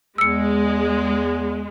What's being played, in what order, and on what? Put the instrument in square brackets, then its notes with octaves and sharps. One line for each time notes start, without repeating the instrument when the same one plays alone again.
[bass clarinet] E2 [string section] G#3 [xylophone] E6 C#7